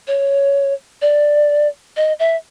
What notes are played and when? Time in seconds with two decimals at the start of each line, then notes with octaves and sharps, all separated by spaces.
0.07 C#5
1.01 D5
1.96 D#5
2.19 E5